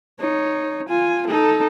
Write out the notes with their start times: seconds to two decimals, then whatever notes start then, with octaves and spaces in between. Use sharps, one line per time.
0.20 D#4 C#5
0.89 F4 G#5
1.27 D#4 A4